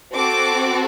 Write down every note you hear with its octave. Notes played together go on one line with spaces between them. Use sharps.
C4 F#4 A4 D6